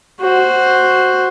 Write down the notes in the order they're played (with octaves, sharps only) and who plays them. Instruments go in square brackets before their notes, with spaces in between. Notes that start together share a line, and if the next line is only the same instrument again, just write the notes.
[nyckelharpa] F#4 C5